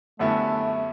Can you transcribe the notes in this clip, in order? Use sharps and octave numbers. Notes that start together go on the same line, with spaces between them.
F#2 D3 G3 A3 B3 E4